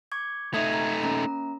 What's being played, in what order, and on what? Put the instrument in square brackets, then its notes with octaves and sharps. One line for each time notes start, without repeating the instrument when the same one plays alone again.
[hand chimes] C#6 D6 G#6
[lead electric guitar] A3 D#4 [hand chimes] E5 D#6 G#6
[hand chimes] A#5
A#3 C#4 A#5